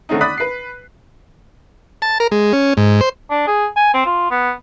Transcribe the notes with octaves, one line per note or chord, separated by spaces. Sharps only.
D3 D#3 A3 C4 C#4 D#4
D5 B5 D#6 F#6 B6
B4 C7
A5
A#4
G#3
C#4
G#2
C5
D4
G#4
G#5
C4
F4
B3